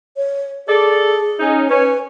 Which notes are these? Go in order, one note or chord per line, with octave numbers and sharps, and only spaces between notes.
C#5
G#4 A4 D5
C#4 D#4
C#4 B4 C#5